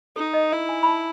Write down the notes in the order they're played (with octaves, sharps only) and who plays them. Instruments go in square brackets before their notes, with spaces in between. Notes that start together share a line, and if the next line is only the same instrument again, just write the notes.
[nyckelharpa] D#4 [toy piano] A4
[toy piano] D#5
[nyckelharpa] E4 [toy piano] E5
[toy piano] G#5
B5
A5